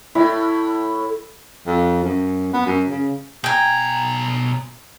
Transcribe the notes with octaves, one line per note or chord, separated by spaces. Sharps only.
A2 E4
F2
F#2
B3
F#2
C#3
B2 G5 G#5 A#5